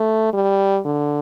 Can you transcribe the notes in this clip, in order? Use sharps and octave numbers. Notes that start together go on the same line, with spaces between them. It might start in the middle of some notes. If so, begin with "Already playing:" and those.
Already playing: A3
G3
D3